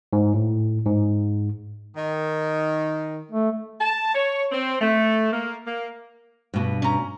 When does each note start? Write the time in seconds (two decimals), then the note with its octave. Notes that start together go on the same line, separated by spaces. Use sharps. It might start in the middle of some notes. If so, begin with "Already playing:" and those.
0.13 G#2
0.34 A2
0.86 G#2
1.97 D#3
3.32 A3
3.81 A5
4.15 C#5
4.52 C4
4.81 A3
5.33 A#3
5.67 A#3
6.54 G2 B2
6.82 C#4 A#5